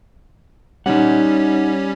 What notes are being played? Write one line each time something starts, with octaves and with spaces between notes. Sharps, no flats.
G3 C#4 D#4 F#5